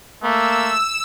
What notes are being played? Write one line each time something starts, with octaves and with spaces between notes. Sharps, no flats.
A3 A#3 E6